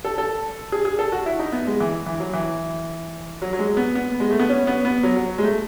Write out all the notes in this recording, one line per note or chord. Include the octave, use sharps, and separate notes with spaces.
A4
A4
G#4
G#4
A4
F#4
E4
D#4
B3
G#3
E3
E3
F#3
E3
F#3
F#3
G#3
B3
B3
G#3
A3
B3
C#4
B3
B3
F#3
F#3
G#3
A3